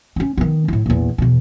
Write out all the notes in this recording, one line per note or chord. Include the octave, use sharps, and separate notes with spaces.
C4 C#4
D#3 B3
A2 E4
A#1 E2
E2 B2